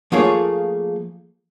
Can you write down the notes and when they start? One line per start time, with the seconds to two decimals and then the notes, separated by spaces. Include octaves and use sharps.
0.12 F3 A3 A#3 F4 G#4 C#5